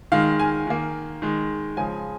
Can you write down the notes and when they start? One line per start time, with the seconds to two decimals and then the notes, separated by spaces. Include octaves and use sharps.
0.12 D#3 G#3 F5
0.39 G#5
0.67 D#3 A#3
1.22 D#3 G#3
1.77 C#3 F3 G#3 G#5